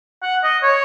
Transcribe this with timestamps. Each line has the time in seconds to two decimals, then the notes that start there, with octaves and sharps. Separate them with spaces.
0.22 F#5
0.43 D#5
0.63 C#5